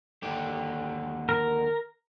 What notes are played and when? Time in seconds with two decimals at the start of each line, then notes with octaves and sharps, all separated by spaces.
0.23 D#2 D3 G4
1.29 A#4